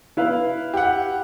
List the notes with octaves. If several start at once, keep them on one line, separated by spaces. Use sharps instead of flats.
E4 B4 F5
G4 F#5